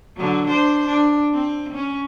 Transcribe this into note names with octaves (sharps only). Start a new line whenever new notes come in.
D3 F#3
D4 C5
D4
C4
C#4